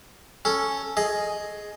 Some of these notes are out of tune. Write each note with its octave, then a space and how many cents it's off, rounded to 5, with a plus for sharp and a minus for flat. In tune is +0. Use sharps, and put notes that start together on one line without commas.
C#4 +0 A4 +0
G#4 +10 D#5 +0